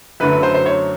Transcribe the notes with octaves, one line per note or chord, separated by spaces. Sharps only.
F#2 D3 F#3 A3 B4
C5
C5
C#5